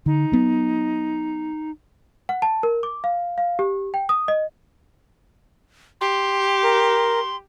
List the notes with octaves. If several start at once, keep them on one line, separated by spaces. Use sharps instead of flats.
D3 D#4
F#3 B3
F#5
A5
A#4
D6
F5
F5
G4
G5
D#6
D#5
G4 C6
A#4